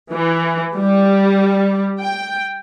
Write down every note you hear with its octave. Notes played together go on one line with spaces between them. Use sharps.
E3
G3
G5